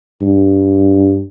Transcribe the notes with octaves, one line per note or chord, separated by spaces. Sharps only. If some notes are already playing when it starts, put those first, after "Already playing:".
G2